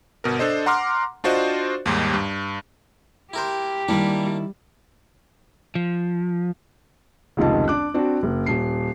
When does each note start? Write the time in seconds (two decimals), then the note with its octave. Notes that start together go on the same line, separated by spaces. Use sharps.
0.24 G1 B2 A#4
0.39 D4 A4 C5 D#5
0.66 F#5 A#5 C6 D6 F6
1.24 D4 F4 F#4 C5 D5 D#5
1.86 D#2 G#2 G3
2.14 G2
3.33 E4 G4 A#4 C5
3.88 D#3 G3 A#3 D4 E4
5.75 F3
7.37 F1 C#2 D#3 F4 D#5 A5
7.68 D4 D6 F#6
7.94 C4 D4 F#4
8.23 F#1
8.46 D#1 C7